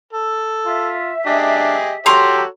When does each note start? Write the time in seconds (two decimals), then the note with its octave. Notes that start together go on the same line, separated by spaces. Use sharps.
0.13 A4
0.66 F4 E5
1.26 D4 G4 G#4 D#5
2.06 F#4 G4 A4 C#5 A#5 C6